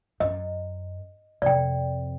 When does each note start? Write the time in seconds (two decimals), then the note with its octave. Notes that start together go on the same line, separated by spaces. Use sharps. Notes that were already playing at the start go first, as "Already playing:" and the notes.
0.20 F#2 D#5
1.42 F2 C3 D5 G5